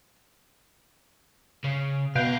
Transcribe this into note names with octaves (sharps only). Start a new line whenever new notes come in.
C#3
B2 B3 B4 F5 G5